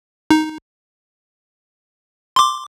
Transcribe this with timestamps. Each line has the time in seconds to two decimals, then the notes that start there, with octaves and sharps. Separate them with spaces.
0.31 D#4
2.36 C6 D6